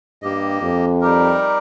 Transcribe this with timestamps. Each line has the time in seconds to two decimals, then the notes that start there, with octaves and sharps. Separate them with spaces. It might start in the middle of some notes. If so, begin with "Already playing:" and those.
0.22 G2 A#3 G4 D#5
0.62 F2
1.01 G3 D#4 G4 A#4